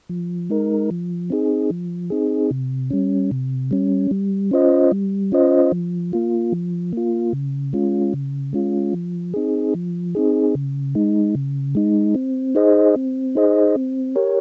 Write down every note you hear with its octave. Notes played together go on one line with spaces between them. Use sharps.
F3
G#3 D#4 A#4
F3
C4 D#4 G#4
F3
C4 D#4 G#4
C3
G3 C#4
C3
G3 C#4
G3
C#4 F4 C5 D#5
G3
C#4 F4 C5 D#5
F3
A#3 F4
F3
A#3 F4
C#3
G#3 C#4 F4
C#3
G#3 C#4 F4
F3
C4 D#4 G#4
F3
C4 D#4 G#4
C#3
G#3 D#4
C#3
G#3 D#4
C4
D#4 G#4 C5 D#5
C4
D#4 G#4 C5 D#5
C4
G4 A#4 C#5